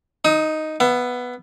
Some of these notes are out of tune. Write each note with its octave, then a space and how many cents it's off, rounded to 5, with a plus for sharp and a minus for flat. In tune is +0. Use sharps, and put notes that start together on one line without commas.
D#4 +0 D#6 +40
B3 +0 E5 +30